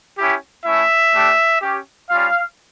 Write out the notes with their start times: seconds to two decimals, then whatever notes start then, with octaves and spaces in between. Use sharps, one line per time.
0.18 C#4 E4 G4
0.66 A3 C#4 E4 E5
1.14 A3 D4 G4
1.62 C#4 G4
2.10 G3 C#4 F4 F5